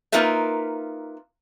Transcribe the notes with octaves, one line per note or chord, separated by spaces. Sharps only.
A#3 D#4 F4 A#4 B4 E5